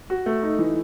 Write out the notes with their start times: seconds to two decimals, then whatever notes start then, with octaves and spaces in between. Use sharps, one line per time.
0.10 F#4
0.26 A3
0.43 D#4
0.59 E3